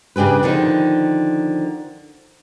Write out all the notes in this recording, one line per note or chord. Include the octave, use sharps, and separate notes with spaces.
C#3 D4 G4 G#4 B4
D3 D#3 F3 D#4